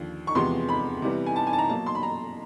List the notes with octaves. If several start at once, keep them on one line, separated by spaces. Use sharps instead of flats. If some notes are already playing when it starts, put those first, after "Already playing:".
Already playing: D#2 D3 F3
C#6
E2 C3 F3 G#3 B3 C6
B5
C3 E3 G3 B3
G#5
A5
G#5
A5
A#5
B2 F#3 A#3 A5
C6
B5
A#5